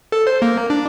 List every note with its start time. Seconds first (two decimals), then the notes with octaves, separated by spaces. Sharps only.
0.12 A4
0.27 C5
0.42 A#3
0.70 D4